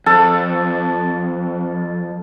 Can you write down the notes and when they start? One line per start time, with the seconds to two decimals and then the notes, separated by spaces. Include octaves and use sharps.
0.06 F2 A4